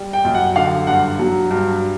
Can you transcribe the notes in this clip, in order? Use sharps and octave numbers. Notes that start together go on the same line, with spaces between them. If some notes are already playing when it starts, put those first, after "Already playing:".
Already playing: G3
G5
F#2
F#5
D3 F5
G2 F#5
F#3
G2